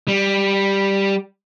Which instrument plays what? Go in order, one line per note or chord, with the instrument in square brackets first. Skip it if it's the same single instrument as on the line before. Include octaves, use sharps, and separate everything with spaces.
[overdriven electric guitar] G3